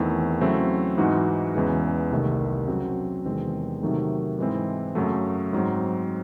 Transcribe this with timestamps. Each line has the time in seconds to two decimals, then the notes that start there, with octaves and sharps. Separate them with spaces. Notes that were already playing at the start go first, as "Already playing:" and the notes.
Already playing: E2 D#3 A3 C4 E4
0.41 C#3 F#3 A3 C4 E4
0.98 G#2 E3 G#3 D#4 F#4
1.55 E2 C#3 E3 G#3
2.11 C2 C3 D#3 A3
2.68 C#3 F#3 C4 F#4
3.25 E2 C3 D#3 G#3 C4
3.83 C3 D#3 F#3 A3 D#4
4.38 G#2 E3 G#3 C4 E4
4.95 F#2 C#3 F#3 A3
5.53 G#2 F#3 C4